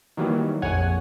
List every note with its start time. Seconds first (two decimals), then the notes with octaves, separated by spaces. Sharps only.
0.17 D#3 E3 F#3 G3 A#3
0.62 A#1 F2 C#5 F#5 G#5